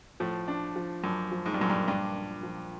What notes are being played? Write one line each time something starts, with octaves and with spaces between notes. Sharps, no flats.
A2 F3
D4
F3
F#2 D4
F3
G#2
G2
F#2 A#2
G2
G2 D4
D4
F3